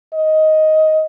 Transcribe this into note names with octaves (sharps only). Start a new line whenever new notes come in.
D#5